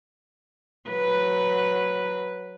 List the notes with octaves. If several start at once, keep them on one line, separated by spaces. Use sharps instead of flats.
F#3 B4